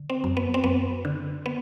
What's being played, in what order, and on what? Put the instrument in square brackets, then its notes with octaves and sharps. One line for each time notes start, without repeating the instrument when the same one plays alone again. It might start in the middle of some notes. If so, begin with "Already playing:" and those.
Already playing: [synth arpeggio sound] D3
C4
F#2
B3
C4
F#2 B3
D3
B3